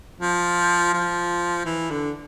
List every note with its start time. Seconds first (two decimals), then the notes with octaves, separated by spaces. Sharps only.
0.20 F3
0.93 F3
1.65 E3
1.90 D3